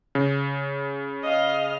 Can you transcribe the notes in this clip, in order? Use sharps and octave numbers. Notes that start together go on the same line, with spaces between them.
C#3
D#5 F5 F6